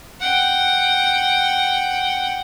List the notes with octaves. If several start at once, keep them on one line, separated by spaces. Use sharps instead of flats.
F#5 G5